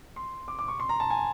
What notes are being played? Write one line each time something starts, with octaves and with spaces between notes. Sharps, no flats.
C6
D6
D6
C#6
C6
A#5
A5
G#5